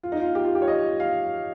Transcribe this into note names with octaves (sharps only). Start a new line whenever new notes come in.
F4
D#4
F4
G4
F4
G4
C#5
D#5
F5